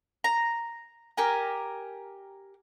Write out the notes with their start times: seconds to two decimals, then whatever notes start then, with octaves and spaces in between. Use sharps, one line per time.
0.24 A#5
1.17 G4 A#4 G#5